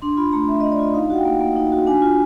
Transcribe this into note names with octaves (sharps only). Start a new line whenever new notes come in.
D4 C6
F4 B5
A3 A#5
A3 E5
D#5
D4
D5
F4 D#5
D#4 F5
F#4 F#5
G5
A#3
A#3
D#4
F#4
D4 G#5
F4